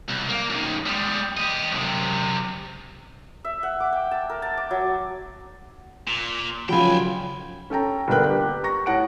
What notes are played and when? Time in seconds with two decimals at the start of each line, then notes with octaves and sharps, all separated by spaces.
0.09 C2
0.29 A#3
0.50 F#2 D#3
0.86 G3 G#3
1.38 G4 D#5
1.72 F#2 C3
3.44 E5
3.63 F#5
3.80 D6
3.92 G5
4.11 A5
4.30 A#4
4.42 A5
4.57 D6
4.71 F#3
6.08 A#2
6.69 C#3 F3 F#3 F4 C#5 G5 G#5 B5
7.70 C#4 A4 G5 A#5
8.08 G1 D3 A#3 B3 G5 F#6
8.30 G4
8.64 A#5 C#6 A#6
8.86 A2 C#5 F#5 A5 D7